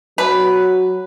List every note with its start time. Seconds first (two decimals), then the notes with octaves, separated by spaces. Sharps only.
0.18 F#3 B4